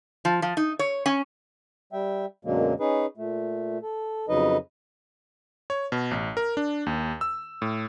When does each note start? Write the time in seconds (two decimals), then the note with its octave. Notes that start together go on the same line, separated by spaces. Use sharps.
0.25 F3
0.42 F3
0.57 D#4
0.79 C#5
1.06 C#4
1.93 G3 E5 G5
2.45 F#2 B2 D3 F#3 G#3 A#3
2.80 C#4 D#4 G#4 B4
3.17 A#2 A3
3.82 A4
4.29 F2 C#3 F#3 D#4 B4 D#5
5.70 C#5
5.92 B2
6.11 A1
6.37 A#4
6.57 D4
6.86 D#2
7.21 E6
7.62 A2